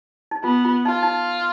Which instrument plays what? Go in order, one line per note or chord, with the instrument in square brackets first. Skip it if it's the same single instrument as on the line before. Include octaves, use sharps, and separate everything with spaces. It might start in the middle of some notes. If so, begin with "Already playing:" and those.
[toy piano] D#4
[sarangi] B3 [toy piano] F4
[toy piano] F4
[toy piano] D#4 [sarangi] F4
[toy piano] D#4